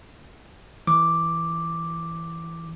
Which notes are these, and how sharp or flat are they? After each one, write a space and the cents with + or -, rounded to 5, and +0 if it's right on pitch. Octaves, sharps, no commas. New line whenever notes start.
E3 +0 D6 +0